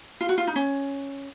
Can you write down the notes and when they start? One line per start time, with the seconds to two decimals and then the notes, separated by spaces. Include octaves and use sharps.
0.21 F4
0.29 F#4
0.38 F4
0.47 D#4
0.56 C#4